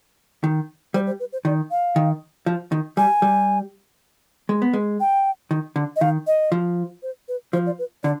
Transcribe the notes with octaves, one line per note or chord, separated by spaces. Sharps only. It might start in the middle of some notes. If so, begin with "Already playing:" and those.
D#3
G3 C5
C5
B4
C5
D#3 D5
F5
D#3
F3
D#3
G3 G#5
G3
G#3
B3
G#3
G5
D#3
D3
D#5
D#3 F5
D#5
F3
C5
B4
F3 C5
D5
B4
D3 D5